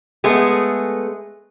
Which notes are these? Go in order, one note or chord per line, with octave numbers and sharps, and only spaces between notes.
G#3 A3 B3 G#4